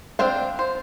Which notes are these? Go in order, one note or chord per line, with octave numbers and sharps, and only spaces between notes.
C4 D4 C5 F5
C5